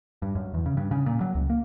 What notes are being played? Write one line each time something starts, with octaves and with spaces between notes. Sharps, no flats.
G2
F#2
E2
C#3
G2
C#3
A#2
F#3
C#2
A#3